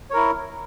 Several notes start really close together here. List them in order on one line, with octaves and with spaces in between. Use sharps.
C#5 A#4 E4